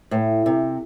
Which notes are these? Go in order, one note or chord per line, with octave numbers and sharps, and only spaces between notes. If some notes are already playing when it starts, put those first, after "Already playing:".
A2
C3